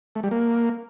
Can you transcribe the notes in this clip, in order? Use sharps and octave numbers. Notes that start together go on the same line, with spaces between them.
A3
G3
A#3